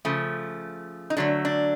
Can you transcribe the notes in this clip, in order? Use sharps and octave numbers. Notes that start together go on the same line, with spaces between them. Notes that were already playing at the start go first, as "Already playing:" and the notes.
C#3 F3 A3
D#4
D3 F#3 A3 D4
D4